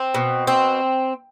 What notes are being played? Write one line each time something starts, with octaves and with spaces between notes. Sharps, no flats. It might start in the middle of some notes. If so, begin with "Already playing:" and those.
Already playing: C4
B2
C4